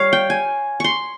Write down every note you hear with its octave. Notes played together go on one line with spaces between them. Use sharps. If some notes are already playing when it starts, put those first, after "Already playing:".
Already playing: G3 C#5 F5
G5
G#5
C6 C#6